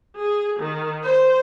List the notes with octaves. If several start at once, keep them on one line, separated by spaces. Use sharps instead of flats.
G#4
D#3
C5